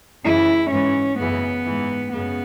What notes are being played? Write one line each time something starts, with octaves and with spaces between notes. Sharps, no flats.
F#2 C#3 E3 E4
G#2 E3 C#4
F#2 C#3 E3 B3
G#2 E3
F#2 C#3 B3